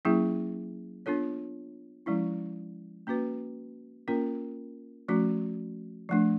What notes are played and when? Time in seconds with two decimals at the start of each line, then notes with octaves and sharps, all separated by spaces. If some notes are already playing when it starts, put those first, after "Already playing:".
0.05 F#3 A#3 C#4 E4 G#4
1.06 B3 D4 F4 A4 C#5
2.06 F3 G#3 C#4 E4
3.07 A#3 C#4 F#4 B4
4.08 A#3 C#4 F4 A#4
5.08 F3 A3 C#4 F#4
6.09 F3 A3 D4